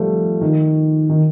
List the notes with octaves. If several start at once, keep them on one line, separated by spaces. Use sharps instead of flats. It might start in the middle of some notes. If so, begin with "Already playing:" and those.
Already playing: F3 G3 A3
D#3
D#3